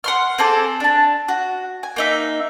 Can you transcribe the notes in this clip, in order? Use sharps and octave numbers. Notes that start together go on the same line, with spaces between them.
F#5 C6 F6
C4 G#4 A4 D6
D4 A5
F#4
G#5
A#3 D#4 E5